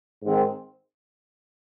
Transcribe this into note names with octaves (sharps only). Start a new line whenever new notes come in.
G#2 D#3 G#3 C4